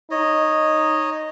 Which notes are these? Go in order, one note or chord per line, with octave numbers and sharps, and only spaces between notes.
D#4 C#5 D#5